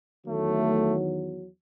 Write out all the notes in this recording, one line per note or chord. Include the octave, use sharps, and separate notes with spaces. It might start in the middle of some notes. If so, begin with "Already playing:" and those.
E2 D#3 F#3 A3